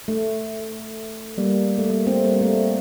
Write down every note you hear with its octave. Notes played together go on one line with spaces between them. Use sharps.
A3
G3 A#3
A3
G3 A#3
A3 C4
G3 A#3
A3